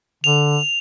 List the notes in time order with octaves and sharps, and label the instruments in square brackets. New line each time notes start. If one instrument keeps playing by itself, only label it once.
[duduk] D3 [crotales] F7